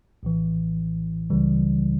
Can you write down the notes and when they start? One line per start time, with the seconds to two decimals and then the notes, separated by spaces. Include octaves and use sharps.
0.23 A#1 A2 E3
1.30 C#2 C#3 E3 G3